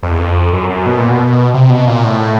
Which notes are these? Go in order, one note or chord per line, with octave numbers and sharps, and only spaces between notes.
F2
E2
F2
F#2
F#2
B2
A#2
B2
C3
B2
A#2
A2